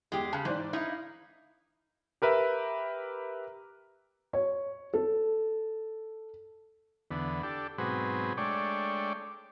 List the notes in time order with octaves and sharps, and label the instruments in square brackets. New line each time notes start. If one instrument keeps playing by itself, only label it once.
[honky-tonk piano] E2 [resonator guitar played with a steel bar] G#3 G4
[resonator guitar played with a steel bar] C#3 [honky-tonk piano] A5 F#6
[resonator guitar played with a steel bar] G#2 [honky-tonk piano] E3 C5 D5
[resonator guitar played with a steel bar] D#4 E4 [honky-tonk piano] F5
[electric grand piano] G4 A#4 B4 E5
[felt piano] C#5
A4
[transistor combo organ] E2 D3 B3
D4 G4 A4
G#2 B2 F#3 C4 G#4 B4
G#3 A3 D4 C#5 D5 G5